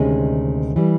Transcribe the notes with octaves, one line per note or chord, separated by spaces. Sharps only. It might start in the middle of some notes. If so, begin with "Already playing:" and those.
Already playing: D2 C3 D#3 G#3 C#4
E3 G3